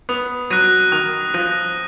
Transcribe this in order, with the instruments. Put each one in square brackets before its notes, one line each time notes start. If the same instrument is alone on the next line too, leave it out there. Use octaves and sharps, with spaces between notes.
[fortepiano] B3 [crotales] D#6
[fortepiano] F#3 [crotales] F#6 A#6 D#7
[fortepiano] D#3 [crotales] D#6
[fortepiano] F3 [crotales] F#6 A#6 D#7